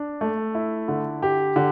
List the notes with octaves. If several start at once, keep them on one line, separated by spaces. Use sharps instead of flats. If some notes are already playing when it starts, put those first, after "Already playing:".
Already playing: D4
A3
E4
D3
G4
D3